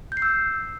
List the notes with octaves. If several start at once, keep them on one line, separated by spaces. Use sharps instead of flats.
G6
C7
E6